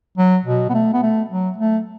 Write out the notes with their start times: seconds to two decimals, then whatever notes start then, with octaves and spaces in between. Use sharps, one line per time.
0.18 F#3
0.45 B2
0.69 B3
0.74 A3
0.93 B3
1.03 A3
1.30 F#3
1.58 A3